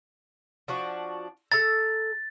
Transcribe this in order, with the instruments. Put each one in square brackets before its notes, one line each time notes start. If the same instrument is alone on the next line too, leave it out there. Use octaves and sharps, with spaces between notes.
[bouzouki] F3 D4 F#4
[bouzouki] A4 A#5 [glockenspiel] A6